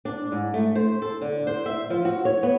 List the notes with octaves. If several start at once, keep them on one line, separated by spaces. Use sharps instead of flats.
D4
G#2
A3
C5
A4
D3
C5
E5
F3
F#4
C#5
B3